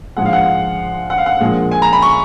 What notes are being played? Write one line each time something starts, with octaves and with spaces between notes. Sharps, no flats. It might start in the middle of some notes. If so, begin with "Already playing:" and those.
A#1 G#2 F3 G#3 F#5
F5
F#5
F#5
F5
F#5
A#1 A#2 F3 G#3
G#5
A#5
B5
C#6